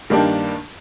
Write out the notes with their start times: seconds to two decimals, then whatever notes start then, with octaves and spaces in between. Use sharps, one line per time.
0.10 G2 D#3 A#3 D4 G4